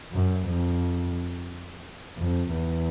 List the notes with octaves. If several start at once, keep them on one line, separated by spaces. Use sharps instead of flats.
F#2
F2
F2
E2